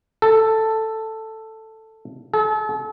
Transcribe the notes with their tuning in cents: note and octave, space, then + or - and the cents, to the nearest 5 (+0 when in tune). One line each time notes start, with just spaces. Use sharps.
A4 +5
A4 -40